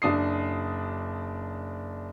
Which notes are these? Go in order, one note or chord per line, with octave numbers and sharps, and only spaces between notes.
F#1 D4 D#6 C7